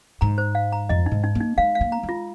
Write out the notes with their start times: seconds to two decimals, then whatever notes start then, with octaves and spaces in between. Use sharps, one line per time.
0.21 G#2 A#5
0.38 C5
0.55 F5
0.72 A#5
0.89 F2 D#5
1.06 D#4
1.12 G#2
1.24 D#4
1.35 A#3
1.41 D#4
1.58 G#3 F5
1.75 F5
1.81 A#3
1.92 A#5
2.03 G#3
2.09 F4